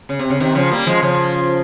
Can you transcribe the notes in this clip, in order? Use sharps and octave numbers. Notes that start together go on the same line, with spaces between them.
C#3
C3
C#3
C3 D#3
C#3 F3
G3 A#3
F3 G#3
C#3 F3